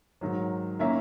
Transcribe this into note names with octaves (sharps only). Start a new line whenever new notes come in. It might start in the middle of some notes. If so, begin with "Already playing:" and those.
G#2 D#3 F#3
D#3 A#3 C#4 E4 E5